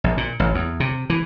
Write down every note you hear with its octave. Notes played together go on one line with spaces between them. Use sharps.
A#1
A#2
A1
E2
C3
E3